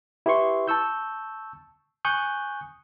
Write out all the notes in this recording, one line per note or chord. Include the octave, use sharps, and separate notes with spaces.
E4 G4 B4 C6 C#6
A5 C#6 E6 G6
G#5 C#6 D#6 F#6 G6